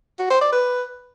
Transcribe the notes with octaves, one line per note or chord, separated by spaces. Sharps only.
F#4
C5
D5
B4